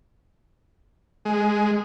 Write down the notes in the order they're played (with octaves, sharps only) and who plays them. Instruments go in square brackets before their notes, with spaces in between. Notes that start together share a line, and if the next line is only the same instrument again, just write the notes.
[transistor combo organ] G#3